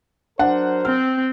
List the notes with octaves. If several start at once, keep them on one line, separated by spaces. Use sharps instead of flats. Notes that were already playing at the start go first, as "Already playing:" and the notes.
F#3 D4 A#4 C5 F#5
C4 F6